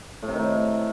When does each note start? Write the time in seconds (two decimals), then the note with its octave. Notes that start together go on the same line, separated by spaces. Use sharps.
0.22 A2
0.28 C3
0.34 D#3
0.39 A2